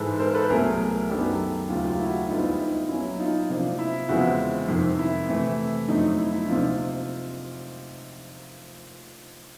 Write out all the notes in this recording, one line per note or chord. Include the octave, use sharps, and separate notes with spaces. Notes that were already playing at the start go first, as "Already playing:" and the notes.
Already playing: G#2 E3 G#3 A4 B4
A#4 C5
A4 B4
C2 B2 F#3 A3 G#4 A#4
F#2 D#3 F#3 B3 D4 G4 A4
D#2 C#3 F#3 A3 F4 G4
F4 G4
E4 F#4
D2 D3 G3 B3 D4 D#4 F4
E4
D#4
B2 F#3 A#3 C#4 E4
D#4 F4
C3 F3 A#3 D4
E4
E2 C#3 F3 G#3 C4 E4 F#4
F2 C3 D#3
E4
C3 E3 A3
F2 D3 F#3 A3 D#4
E4
E4
D2 C3 F3 A#3 D4 D#4 F4